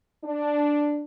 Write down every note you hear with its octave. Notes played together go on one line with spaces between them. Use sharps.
D4